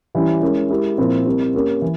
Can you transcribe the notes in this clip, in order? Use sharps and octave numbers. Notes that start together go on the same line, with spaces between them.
E3 G3 C#4 E4
G#3 C#4 E4 A#4
G#3 E4 G4 A#4
A#2 F3 C4 E4 A#4
G3 C4 E4 A#4
A#3 C#4 G4 A#4
E3